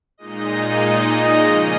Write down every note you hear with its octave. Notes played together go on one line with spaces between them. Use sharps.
A#2 G#3 D#4 D#5
D#5
C#3 F3 A#3 C#4 D#5